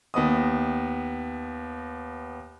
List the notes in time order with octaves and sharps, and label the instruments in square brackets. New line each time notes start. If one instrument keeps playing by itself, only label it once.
[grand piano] D#2 B3 D#5 D#6